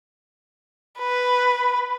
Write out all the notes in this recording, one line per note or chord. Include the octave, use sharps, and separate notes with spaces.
B4